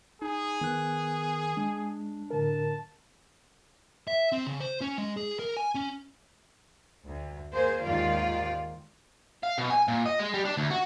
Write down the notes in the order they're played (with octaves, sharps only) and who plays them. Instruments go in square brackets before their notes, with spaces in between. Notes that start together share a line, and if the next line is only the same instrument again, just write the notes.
[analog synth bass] D#4 [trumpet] G#4
[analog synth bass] D#3 [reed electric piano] B3 F#6
[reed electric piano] G#3 [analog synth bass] D4
[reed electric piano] A2 D3 A#4 [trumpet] A5
[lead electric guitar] E5
C4
C#3
C5
C#4
G#3
G#4
A#4
G#5
C#4
[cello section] D2
A#3 G#4 C5
D#2 G#2 D#3 F4 D5 F5
[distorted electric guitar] F5
B2
G#5
A#2
D#5
G#3
G3
D4
D2
F#4